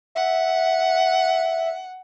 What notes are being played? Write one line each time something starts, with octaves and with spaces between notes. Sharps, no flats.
E5 F#5